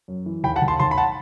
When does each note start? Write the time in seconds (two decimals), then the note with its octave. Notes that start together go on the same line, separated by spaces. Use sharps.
0.08 F#2
0.26 E3
0.44 D#2 G5 B5
0.56 F#5 A5
0.62 D#2
0.68 A5 C6
0.80 D#2 A5 C6
0.91 B5
0.98 F#5 A5